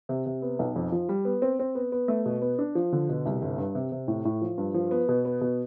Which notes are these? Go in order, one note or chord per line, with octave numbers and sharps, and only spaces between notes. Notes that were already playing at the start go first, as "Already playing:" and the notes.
C3
C3
B3
B1
F2
F3
G3
B3
C4
C4
B3
B3
A3
B2
B3
D4
F3
D3
B2
C2
G1
G2
C3
C3
A2
A2
F3
G2
F3
B3
B2
B3
B2